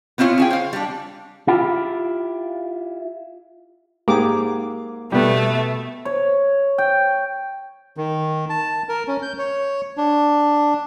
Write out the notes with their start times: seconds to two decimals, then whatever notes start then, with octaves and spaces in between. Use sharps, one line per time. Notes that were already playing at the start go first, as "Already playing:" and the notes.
0.18 B3 C4 E4 F4 C#5
0.38 C#4 G#4 G5
0.50 C5 F5
0.73 G3 D4
1.47 E4 F4 G4
4.08 G#2 A#3 G4 G#4 D6
5.12 B2 G3 A3 B3
6.05 C#5
6.78 G5
7.97 D#3
8.50 A5
8.89 A#4
9.07 C#4
9.22 G6
9.39 C#5
9.97 D4